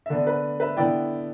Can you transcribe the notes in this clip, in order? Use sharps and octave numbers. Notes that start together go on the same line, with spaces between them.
E5
D3 B3 D4 D5
B4
B4 E5
D3 B3 E4 D5 G5